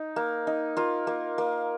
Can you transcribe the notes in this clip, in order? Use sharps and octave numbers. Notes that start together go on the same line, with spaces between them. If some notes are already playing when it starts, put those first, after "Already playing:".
Already playing: D#4
A#3
D#4
A#3 F4
A#3
A#3